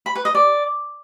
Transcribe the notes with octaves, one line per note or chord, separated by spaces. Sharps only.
B5
B4
D#5
D5